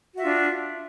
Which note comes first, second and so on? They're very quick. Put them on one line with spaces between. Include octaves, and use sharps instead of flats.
F#4 E5 F4 D4